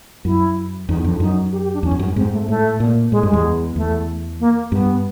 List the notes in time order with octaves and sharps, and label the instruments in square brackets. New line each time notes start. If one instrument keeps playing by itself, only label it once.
[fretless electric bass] F#2 [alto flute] E4
[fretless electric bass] E2 [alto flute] D#4
[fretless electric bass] F2 [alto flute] D4
[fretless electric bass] F#2 [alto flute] D#4
[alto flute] G4
G4
D4
[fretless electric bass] E2 [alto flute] C#4
[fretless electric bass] F2
F#2
G2
[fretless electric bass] G#2 [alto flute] C4
[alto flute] A3
[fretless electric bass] A2 [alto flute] A3
[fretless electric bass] A#2
[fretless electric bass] A2 [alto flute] G#3
[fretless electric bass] G2 [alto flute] G#3
[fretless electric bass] E2
[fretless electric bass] E2 [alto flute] A3
[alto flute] A#3
[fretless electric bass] G2 [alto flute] B3